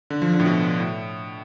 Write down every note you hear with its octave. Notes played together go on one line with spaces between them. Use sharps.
D3
F3
D3
A2
B2
A2